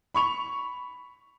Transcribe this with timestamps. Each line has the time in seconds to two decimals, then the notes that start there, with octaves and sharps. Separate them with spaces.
0.14 B5 C#6 F7